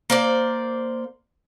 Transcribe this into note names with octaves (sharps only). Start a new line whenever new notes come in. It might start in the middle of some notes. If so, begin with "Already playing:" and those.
A#3 C5 D5